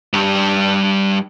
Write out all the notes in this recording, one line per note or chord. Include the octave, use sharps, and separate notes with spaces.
G2 G3